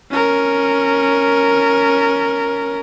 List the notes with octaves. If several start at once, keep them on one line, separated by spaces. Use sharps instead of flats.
C#4 A#4